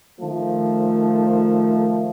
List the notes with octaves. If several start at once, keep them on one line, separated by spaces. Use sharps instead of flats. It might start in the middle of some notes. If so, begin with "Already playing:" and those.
D#3 F3 A3